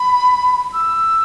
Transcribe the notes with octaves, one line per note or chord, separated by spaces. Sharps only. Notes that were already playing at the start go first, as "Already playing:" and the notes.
Already playing: B5
E6